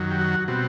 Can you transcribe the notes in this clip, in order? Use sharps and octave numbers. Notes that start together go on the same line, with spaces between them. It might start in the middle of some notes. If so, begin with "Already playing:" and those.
Already playing: F#2 D#3 F#3
G4
F#4
B2 G3 C4 F#4